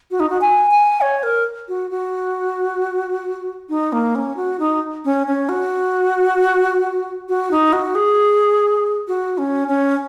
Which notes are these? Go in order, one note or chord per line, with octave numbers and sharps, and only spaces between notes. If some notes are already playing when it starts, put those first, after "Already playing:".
F#4
D#4
F#4
G#5
G#5
C#5
A#4
F#4
F#4
D#4
A#3
C#4
F#4
D#4
C#4
C#4
F#4
F#4
D#4
F#4
G#4
F#4
C#4
C#4